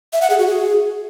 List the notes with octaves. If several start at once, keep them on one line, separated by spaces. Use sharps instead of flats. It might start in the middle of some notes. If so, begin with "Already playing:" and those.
E5
F#5
G#4
F#4
G#4